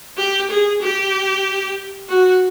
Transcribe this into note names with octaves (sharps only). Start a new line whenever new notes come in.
G4
G#4
G4
F#4